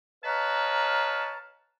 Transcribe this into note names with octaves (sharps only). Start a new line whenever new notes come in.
B4 C#5 D#5 F5 A5 A#5